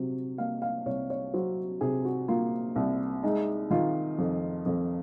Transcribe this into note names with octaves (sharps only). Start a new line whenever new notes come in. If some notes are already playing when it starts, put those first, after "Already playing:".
Already playing: C3 F#3
A#3 F5
F5
C2 C#5
C#5
F#3 C5
C3 G#4
F#4
A#3 F4
C2
G#3 D#4
D#3 F4
F2
F2